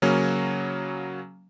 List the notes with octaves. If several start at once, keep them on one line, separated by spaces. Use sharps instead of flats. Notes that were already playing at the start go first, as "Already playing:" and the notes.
C#3 F#3 A#3 C#4